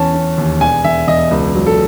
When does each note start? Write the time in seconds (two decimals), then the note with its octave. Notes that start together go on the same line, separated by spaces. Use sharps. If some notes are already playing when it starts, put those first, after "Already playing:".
Already playing: E2 C#4 A5
0.14 C#4
0.38 D#2
0.61 E1 G#5
0.84 E1 E5
1.08 E1 D#5
1.31 C#2
1.55 F#3
1.67 A4